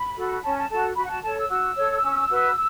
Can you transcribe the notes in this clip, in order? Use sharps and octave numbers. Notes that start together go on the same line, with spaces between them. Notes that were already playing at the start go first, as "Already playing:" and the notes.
Already playing: B5
F#4 A4
C#4 A5
A5
F#4 A4 A5
F#4 B5
F#5
A5
A4 C#5 A5
E6
F#4 E6
A4 C#5
C#4
F#4 B4